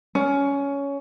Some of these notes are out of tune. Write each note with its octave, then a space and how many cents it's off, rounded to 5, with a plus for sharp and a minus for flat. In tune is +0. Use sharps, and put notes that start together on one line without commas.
C#4 +15